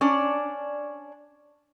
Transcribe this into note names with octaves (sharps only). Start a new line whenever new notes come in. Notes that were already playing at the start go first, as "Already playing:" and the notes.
C#4 D4 D5